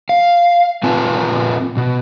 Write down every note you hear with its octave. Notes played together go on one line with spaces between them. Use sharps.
F5
A#2 C4 F4 B4 G#5 A5
B2